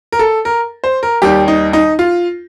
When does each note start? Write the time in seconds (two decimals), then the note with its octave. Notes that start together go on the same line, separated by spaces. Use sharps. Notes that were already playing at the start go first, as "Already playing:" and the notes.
0.12 A#4
0.19 A4
0.45 A#4
0.84 C5
1.03 A#4
1.22 D#2 D#3 G3 G4
1.48 D#4
1.73 D#4
1.99 F4